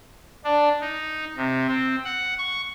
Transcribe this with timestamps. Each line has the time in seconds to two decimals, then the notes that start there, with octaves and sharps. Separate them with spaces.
0.44 D4
0.80 D#4
1.37 C3
1.67 C4
2.05 F#5
2.38 C#6